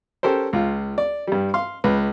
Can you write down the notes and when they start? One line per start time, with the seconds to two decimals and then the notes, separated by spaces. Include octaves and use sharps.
0.23 C#4 G4 A4 A#4 C5
0.53 C#2 F4
0.98 D5
1.27 G2 G3
1.54 F5 C6
1.84 C#2 B4